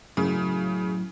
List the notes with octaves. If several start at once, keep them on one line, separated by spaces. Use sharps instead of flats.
F#2 A2 C#3